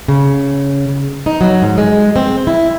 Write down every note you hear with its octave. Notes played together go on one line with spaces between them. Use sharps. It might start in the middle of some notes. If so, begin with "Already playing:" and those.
C#3
D#4
F#3
G#2
G#3
C4
E4